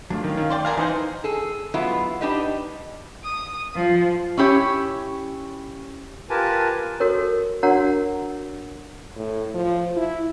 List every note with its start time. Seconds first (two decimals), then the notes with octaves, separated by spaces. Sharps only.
0.10 F#3 A3 D4 F4
0.24 D#3 C#4 F5
0.37 D#3
0.50 C5 D5 G5 C6
0.65 F#3 G#4 A#4 F5 A5 B5
0.77 E3 G#3 D#4 C5
1.24 G#4 A4
1.74 F#3 G#3 B3 E4 F4
2.21 D4 D#4 G4 B4 D#5
3.24 D#6
3.76 F3
4.37 C#4 E4 G4 C#5
6.30 F4 G4 A#4 B4 G#5 A5
7.00 F#4 A4 A#4 C#5
7.63 D4 F#4 A#4 C#5 F#5 A#5
9.16 A2
9.54 F3
9.97 E4